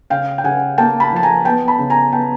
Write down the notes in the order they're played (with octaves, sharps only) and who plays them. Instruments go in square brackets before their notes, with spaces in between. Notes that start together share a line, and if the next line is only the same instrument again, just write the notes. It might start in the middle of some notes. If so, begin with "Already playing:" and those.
[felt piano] C#3 F5 G5
G5
C#3 F#5 G#5
A#3 G5 A5
A5 B5
F3 A5
G#5 A#5
B3 G5 A5
A5 B5
C#3
G#5 A#5
B3 G5 A5